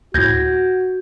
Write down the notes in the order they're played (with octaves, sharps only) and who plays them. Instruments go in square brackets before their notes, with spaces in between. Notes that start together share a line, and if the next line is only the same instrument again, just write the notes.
[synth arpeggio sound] D2 A2 [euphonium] F#4 [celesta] G6 G#6 A#6